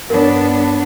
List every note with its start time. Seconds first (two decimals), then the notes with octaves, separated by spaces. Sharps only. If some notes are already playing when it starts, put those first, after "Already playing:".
0.10 G2 B3 D4 A#4 C#5